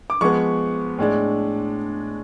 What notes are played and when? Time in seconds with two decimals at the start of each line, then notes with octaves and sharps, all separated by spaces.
0.10 D6
0.21 F3 G#3 B3 C#6
0.98 A2 G#3 D4